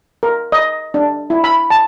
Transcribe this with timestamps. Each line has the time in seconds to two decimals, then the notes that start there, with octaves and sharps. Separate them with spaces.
0.23 A#4
0.52 D#5
0.94 D4
1.30 E4
1.44 B5
1.70 A5